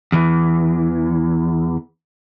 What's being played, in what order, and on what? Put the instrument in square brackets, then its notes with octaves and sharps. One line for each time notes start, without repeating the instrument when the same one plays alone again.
[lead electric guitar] E2 E3